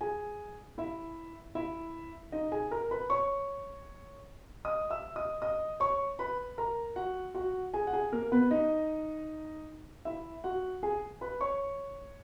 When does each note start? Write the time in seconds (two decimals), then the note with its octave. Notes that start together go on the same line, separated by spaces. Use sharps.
0.01 G#4 G#5
0.78 E4 E5
1.55 E4 E5
2.32 D#4 D#5
2.52 G#4 G#5
2.71 A#4 A#5
2.91 B4 B5
3.10 C#5 C#6
4.65 D#5 D#6
4.90 E5 E6
5.16 D#5 D#6
5.42 D#5 D#6
5.80 C#5 C#6
6.19 B4 B5
6.58 A#4 A#5
6.96 F#4 F#5
7.34 F#4 F#5
7.74 G#4 G#5
7.87 F#5
7.93 G#4 G#5
8.12 A#3 A#4
8.32 B3 B4
8.51 D#4 D#5
10.05 E4 E5
10.44 F#4 F#5
10.83 G#4 G#5
11.21 B4 B5
11.41 C#5 C#6